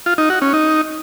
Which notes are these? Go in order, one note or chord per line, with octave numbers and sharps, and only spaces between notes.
F4
D#4
F#4
C#4
D#4